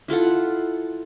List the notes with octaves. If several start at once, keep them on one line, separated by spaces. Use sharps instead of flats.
E4 F4 A4 F#5